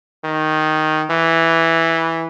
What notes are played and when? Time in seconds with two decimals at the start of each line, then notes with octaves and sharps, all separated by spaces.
0.24 D#3
1.10 E3